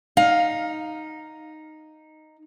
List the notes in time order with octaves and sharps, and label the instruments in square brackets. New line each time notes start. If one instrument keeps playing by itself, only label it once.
[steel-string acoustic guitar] D#4 [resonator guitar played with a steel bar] F5